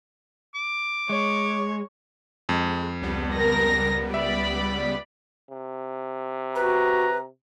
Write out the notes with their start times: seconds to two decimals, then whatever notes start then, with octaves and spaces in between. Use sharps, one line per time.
0.55 D6
1.09 G#3 C#5
2.49 F2 G#3
3.02 C#2 G3 B3
3.35 A#4 A#6
4.14 D5 E5 B5
5.50 C3
6.55 F#4 B4 A#5